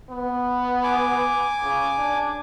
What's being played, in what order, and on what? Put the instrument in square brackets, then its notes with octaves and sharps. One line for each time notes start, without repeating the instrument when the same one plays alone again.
[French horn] B3
[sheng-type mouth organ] G#5 D6
[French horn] C#3
D4